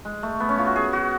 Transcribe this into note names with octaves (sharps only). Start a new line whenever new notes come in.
G#3
A3
B3
C#4
F4
F#4
G#4
F#4